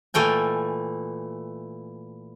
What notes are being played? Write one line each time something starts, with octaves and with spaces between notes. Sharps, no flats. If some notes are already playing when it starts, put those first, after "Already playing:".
A#2 E3 A3 G5 G#5